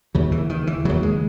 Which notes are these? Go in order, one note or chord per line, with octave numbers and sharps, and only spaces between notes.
D#2 C#3 F#3
E3
D#3
E3
D#2 C#3 F#3
G#3